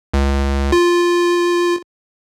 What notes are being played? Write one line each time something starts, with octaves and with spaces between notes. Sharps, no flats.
C#2
F4